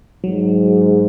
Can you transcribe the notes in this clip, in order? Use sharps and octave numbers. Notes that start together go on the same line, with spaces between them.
G#2 F#3